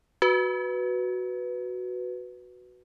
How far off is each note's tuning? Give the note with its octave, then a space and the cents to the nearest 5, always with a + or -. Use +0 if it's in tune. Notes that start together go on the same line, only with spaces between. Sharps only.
F#4 +0 B4 +0